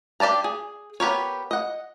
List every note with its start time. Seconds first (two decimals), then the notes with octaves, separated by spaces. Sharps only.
0.20 D4 G4 D5 A5 A#5
0.44 G#4
1.00 B3 G4 A#4 C#5
1.51 D#5 F#5